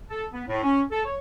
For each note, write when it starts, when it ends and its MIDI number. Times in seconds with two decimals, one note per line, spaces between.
0.10 0.26 69
0.33 0.43 59
0.48 0.63 45
0.63 0.82 61
0.92 1.00 69
1.05 1.18 73